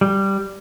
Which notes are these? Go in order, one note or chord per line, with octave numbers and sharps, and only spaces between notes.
G3